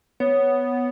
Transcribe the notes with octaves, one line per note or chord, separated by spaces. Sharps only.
B3 C#5